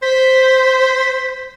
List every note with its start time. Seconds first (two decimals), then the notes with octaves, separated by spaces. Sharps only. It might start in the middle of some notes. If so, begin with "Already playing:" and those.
0.02 C5 B6